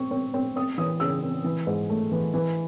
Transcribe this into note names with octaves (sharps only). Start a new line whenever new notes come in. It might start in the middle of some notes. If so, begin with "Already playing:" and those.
Already playing: C4 C#6
C4
C4
C4 D#6
E3 D#6
C#3 E6
C4
E3
G#2
A3
E3
E3